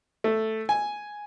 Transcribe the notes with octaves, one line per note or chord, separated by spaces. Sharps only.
A3
G#5